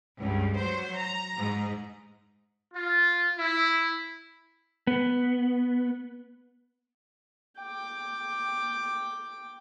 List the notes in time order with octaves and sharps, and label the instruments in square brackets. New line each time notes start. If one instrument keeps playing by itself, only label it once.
[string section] C#2 G2
F#3 C5
A#5
G#2
[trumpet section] F4
E4
[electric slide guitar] B3
[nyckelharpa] G5 D6